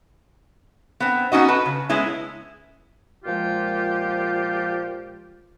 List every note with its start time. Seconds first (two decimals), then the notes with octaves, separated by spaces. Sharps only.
1.00 B3 C4
1.32 B3 C#4 D#4 F#4 D#5
1.49 B4 A5
1.66 C#3
1.89 G#3 B3 C#4 E4
3.24 A#2 F3 G#3 F4 G4